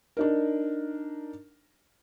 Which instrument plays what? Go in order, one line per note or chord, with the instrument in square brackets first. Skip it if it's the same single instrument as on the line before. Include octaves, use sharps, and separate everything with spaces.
[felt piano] D4 D#4 A#4